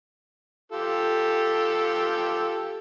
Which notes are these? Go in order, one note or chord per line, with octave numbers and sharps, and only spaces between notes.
F4 G4 A4